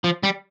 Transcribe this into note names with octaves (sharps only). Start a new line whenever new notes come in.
F3
G3